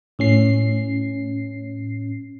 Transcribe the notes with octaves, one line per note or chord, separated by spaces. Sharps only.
A2 C#4 C7